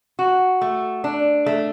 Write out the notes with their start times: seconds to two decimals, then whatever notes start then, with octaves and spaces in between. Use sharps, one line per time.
0.19 F#4
0.61 A3
1.04 D4
1.46 A3